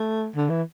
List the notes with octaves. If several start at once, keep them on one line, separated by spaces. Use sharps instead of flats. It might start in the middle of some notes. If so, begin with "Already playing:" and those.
Already playing: A3
D3
E3